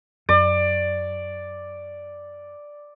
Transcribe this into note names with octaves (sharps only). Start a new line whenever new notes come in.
F#2 D5